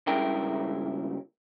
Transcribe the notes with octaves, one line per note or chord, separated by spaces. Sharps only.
C#2 G2 C#3 E4 A#4 G5